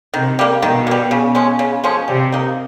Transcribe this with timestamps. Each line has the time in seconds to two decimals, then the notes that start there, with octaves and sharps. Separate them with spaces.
0.14 C3 D#3
0.39 G3 A#3
0.62 B2 D#3
0.87 A#3
0.91 G3
1.11 C#3
1.35 F3 G#3 C#4
1.59 C#3
1.84 F3 G#3 C#4
2.08 C3 G3
2.32 A#3 D#4